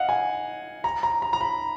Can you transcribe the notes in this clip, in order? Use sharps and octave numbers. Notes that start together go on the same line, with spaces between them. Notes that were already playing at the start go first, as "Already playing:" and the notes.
Already playing: D#5 F5 F#5
G#5
A#5
A#5
A#5
A#5
B5